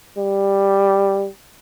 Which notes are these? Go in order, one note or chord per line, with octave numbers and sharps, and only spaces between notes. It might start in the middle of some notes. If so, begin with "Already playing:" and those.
G3